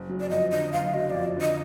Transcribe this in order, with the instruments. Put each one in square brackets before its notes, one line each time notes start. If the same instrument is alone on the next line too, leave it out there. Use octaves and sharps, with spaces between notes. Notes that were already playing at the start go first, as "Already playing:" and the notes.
Already playing: [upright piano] F#1
F#3
[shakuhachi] D5
[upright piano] F2 [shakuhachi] D#5
[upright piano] D3 [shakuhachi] D#5
[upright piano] F#1 [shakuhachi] F5
[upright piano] F#3 [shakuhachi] D#5
[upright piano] F2 [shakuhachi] D5
[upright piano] D3 [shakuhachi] D#5